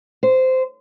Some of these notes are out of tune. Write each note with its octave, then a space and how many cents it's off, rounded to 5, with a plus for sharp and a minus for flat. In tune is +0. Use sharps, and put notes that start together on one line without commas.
C5 -15